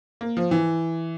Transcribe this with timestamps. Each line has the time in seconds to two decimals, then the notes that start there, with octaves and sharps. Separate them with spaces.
0.21 A#3
0.37 F3
0.51 E3